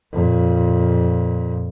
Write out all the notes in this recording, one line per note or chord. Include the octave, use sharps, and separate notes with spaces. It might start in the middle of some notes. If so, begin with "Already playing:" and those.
F2 A#2